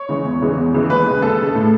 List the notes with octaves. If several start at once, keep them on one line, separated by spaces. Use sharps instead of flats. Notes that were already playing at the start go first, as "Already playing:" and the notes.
Already playing: C#5
C#3 E3 G#3
E2
C#3 E3 G#3
E2
C#3 E3 G#3
D#2 B4
C#3 G#3
D#2 A4
C#3 G#3
A2